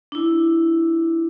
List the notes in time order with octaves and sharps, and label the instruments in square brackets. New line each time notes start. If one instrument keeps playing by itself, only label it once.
[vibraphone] D4 E4